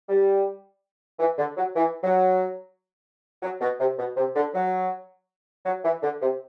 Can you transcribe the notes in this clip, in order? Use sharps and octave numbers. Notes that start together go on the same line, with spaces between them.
G3
E3
D3
F#3
E3
F#3
F#3
B2
C3
B2
C3
D3
F#3
F#3
E3
D3
C3